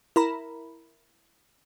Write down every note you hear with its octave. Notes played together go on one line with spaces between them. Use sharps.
E4 A#4 A#5 B5